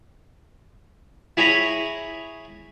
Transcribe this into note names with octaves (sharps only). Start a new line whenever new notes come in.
E4 G#4 C#5 G#5 A#5 B5